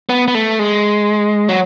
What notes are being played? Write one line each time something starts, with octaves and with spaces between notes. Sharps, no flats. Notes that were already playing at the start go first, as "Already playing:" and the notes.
B3
B3
A3
G#3
F#3